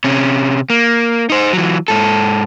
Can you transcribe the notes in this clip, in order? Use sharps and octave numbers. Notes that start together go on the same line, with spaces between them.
C3 C#4
A#3
D#4 C5
E3 F#3
G#2 A4